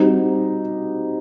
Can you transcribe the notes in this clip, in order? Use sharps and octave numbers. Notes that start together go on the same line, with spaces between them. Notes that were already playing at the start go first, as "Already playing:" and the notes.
Already playing: G3 C4 D#4 F#4